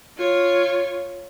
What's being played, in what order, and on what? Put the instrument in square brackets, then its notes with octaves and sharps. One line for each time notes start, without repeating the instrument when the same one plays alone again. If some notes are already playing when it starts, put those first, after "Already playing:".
[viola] F4 C#5